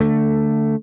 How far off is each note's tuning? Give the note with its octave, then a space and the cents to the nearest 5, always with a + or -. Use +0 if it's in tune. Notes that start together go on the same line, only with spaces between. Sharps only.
D3 +0 A3 +10